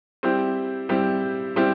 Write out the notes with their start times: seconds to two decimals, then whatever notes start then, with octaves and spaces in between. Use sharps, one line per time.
0.23 G3 C4 E4 G4
0.89 G3 C4 E4 G4
1.56 G3 C4 E4 G4